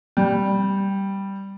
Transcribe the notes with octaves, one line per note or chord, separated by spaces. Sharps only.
G3